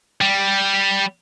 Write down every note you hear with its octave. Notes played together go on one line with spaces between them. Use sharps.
G3